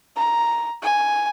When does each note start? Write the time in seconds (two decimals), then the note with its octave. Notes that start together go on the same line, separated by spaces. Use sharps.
0.16 A#5
0.82 G#5